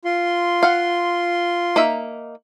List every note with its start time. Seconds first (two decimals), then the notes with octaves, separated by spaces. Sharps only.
0.05 F4 C6
0.63 F5 F#5
1.76 A#3 D#4 E5